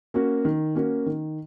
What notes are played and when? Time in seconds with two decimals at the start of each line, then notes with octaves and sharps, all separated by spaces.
0.14 A#3 C#4 F#4
0.45 D#3
0.75 A#3 C#4 F#4
1.06 D#3